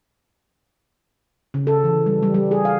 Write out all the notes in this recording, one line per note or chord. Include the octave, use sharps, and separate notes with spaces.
C#3
A4
E3
G3
G3
G3
G#4
F5